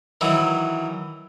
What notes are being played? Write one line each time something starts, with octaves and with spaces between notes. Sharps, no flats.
D#3 E3 F#3